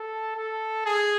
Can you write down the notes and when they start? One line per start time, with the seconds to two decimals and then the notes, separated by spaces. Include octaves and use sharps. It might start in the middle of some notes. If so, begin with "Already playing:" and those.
Already playing: A4
0.36 A4
0.86 G#4